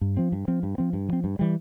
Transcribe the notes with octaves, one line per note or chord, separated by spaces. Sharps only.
G2
F3 C4
G2
F3 C4
G2
F3 C4
G2
F3 C4
G2
E3 G3